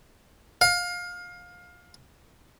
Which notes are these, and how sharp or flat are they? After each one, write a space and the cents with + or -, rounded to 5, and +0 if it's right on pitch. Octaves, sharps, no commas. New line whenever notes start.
F5 +25